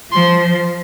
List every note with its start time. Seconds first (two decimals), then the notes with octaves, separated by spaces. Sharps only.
0.12 F3 C6